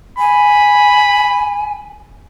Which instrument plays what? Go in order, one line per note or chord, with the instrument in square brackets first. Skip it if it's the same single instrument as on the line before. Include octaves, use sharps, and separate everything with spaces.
[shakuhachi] G#5 [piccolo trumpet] B5